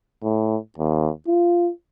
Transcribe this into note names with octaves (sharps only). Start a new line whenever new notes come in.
A2
D#2
F4